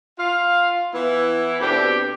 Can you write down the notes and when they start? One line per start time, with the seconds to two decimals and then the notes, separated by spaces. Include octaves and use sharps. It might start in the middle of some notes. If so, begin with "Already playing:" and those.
0.18 F4 F5
0.93 E3 B3 E4
1.60 B2 C4 D4 G4 A4